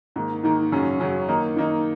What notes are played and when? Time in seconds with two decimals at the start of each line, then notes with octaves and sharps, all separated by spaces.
0.16 G#2 D#3 A#3
0.43 G#2 D#3 A#3
0.72 F#2 C#3 F#3 C#4
1.00 F#2 C#3 F#3 C#4
1.28 D#3 A#3 D#4
1.56 D#3 A#3 D#4